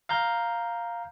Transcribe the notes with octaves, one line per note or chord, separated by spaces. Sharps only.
F5 A#5 G6